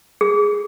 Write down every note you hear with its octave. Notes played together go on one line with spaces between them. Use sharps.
G#4